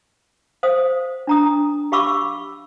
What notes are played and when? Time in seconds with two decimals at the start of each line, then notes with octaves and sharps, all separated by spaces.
0.63 C5 F5 D#6
1.27 D4 A#5 D#6
1.92 G4 F5 B5 C#6 D6 E6